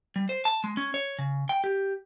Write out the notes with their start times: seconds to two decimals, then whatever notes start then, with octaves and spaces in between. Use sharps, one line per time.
0.16 G3
0.29 C5
0.45 A5
0.64 G#3
0.77 C#4
0.94 C#5
1.19 C#3
1.49 G5
1.64 G4